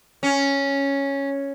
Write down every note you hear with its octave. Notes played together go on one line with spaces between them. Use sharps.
C#4